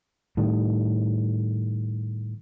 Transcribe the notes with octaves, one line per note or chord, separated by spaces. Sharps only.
A2 D#3 G3